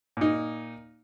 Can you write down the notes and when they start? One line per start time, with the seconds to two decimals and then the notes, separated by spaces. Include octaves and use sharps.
0.17 A#2 D#4